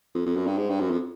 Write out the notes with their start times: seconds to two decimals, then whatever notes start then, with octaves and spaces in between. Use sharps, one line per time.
0.15 F2
0.26 F2
0.36 F#2
0.47 G2
0.58 G#2
0.69 G2
0.80 F#2
0.90 F2